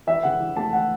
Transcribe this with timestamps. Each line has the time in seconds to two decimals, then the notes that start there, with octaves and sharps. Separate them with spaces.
0.07 E3 E5
0.23 C#3 F#5
0.40 E3
0.57 A3 A5
0.73 E3 F#5